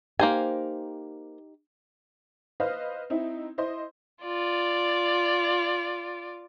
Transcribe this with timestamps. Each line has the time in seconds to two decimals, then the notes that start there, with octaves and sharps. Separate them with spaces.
0.19 A#3 D#4 G4 C5 G#5
2.60 B4 C5 D#5 F5
3.10 C4 D#4 E4
3.58 E4 C5 D#5 C6
4.23 F4 D5